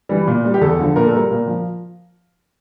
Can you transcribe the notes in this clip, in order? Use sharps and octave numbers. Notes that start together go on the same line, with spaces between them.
E3 G3
A#2
G3
G4
E2 A4
D3 F3
A#2 A#4
A4
G3 A#4
A#2
F3